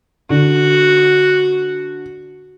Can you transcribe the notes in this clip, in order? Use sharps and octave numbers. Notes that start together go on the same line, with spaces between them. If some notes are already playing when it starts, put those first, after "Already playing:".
D3 F#4